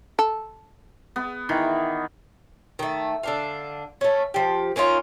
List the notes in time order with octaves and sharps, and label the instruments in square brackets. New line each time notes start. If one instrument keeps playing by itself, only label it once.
[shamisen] A4
[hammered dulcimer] B3
D#3 E3
[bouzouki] D#3 A3
D3 D4 F5
A3 C#4
F3 G4
A#3 C#4 D#4 F4